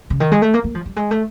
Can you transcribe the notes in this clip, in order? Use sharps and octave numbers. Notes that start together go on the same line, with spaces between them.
C#3
D#3
G#3
A3
A#3
A#3
F3
G3
G#3
A3